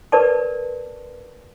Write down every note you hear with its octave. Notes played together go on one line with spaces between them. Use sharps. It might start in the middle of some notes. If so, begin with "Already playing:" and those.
A#4 B4 D5 A5